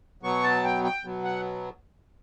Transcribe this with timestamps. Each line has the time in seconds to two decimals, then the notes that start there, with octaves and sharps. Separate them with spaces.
0.23 B2 F#3 B3 C#6
0.44 A5
0.64 G5
0.84 G5
1.05 B2 F#3 B3
1.24 F#5